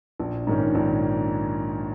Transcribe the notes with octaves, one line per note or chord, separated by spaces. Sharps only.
A#1
G#2 D#3 C#4
A#1